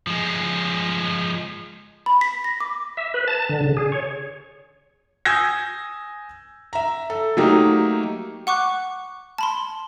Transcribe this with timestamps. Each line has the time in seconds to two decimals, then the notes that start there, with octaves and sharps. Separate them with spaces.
0.07 F3 G#3
2.06 B5
2.21 B6
2.44 A#6
2.60 D6
2.97 E5
3.14 B4
3.28 A5
3.49 D3
3.64 C#3
3.77 G#4
3.92 C#5
5.25 G#5 D#6 E6 G6 G#6 A#6
6.73 E5 A#5
7.10 A4
7.37 F#3 A3 A#3 D#4 G4
8.47 F#5 C#6 D6 F#6
9.38 A5 B5 C6